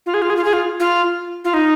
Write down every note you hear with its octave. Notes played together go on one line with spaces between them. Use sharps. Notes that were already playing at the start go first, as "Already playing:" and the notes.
F4
G#4
F4
G#4
F4
G#4
F4
F4
F4
D#4